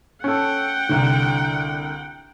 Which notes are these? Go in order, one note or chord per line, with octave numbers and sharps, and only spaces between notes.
C#4 A4 F#5 G5
C2 D3